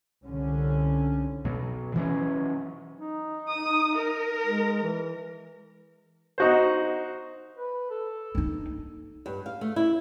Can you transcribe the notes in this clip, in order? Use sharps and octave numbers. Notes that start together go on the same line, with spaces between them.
C2 D3 C#4
B2 F#3
E3 F#3 C#4
D#4
D#6
A#4
G#3
E3
D#4 F#4 C5
B4
A4
A#3 D#4
G2
F5
A3
E4